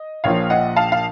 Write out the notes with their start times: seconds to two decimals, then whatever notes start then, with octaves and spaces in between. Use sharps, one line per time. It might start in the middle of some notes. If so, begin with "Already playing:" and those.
Already playing: D#5
0.24 A#1 A#2 F3 C#5 F5
0.50 D#5 F#5
0.76 F5 A5
0.92 F5